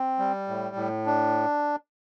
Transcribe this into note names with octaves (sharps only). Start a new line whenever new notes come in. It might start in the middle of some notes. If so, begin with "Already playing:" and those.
Already playing: C4
G3
A2
A2
D4